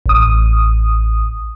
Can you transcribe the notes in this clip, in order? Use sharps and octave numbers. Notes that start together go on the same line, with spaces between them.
A1 D#6